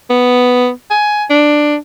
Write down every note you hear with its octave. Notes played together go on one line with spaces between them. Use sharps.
B3
G#5
D4